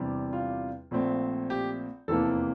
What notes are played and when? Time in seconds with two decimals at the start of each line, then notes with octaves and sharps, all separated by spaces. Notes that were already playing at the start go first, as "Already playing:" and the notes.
Already playing: E2 C3 G3 D4
0.33 F4
0.91 A#1 A#2 A3 C4
1.50 G4
2.08 F1 E2 C3 E3 A#3 A4